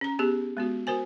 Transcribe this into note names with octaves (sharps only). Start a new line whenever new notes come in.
C#4 A#5
B3 G4 G#4
G#3 B3 F#4
F#4 A#4 C5 G#5